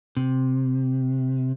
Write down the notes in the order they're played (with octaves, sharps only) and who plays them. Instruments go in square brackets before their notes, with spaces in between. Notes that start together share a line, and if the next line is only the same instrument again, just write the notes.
[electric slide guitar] C3